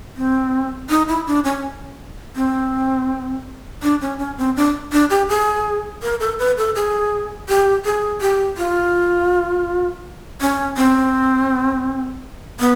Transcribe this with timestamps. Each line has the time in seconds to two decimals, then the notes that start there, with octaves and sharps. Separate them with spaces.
0.17 C4
0.90 D#4
1.08 E4
1.27 D4
1.45 C#4
2.36 C4
3.83 D4
4.01 C#4
4.19 C#4
4.38 C4
4.56 D4
4.92 D4
5.10 G4
5.29 G#4
6.03 A#4
6.20 A4
6.39 B4
6.57 A4
6.75 G#4
7.49 G4
7.85 G#4
8.21 G4
8.57 F4
10.41 C#4
10.77 C4
12.60 B3